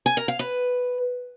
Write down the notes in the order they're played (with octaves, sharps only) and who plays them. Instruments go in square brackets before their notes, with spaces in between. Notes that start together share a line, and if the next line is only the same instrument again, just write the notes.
[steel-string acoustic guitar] G#5
A#4
F5
B4